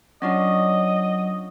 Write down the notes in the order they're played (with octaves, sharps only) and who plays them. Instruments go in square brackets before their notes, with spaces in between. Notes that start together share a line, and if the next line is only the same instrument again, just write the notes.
[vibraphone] F#3 [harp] C#4 D4 F4 [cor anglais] D#5